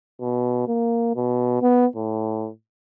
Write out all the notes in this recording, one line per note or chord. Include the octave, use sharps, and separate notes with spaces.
B2
A#3
B2
B3
A2